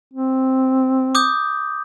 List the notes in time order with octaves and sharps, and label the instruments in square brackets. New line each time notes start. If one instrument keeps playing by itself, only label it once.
[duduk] C4
[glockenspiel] D6 D#6 G6